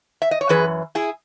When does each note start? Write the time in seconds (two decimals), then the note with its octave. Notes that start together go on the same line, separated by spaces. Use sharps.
0.22 E5
0.31 D#5
0.41 C#5
0.49 F#2 E3 G#4 B4
0.95 E4 G#4